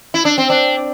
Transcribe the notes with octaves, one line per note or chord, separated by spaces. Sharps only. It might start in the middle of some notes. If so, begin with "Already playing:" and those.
E4
D4
C4
D4